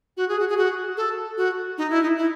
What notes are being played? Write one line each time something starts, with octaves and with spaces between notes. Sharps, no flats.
F#4
G#4
F#4
G#4
F#4
A4
F#4
D#4
E4
D#4
E4